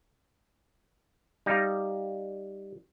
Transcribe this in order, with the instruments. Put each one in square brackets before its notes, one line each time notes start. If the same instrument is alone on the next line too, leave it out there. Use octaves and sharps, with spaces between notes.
[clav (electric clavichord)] G3 D#4 F5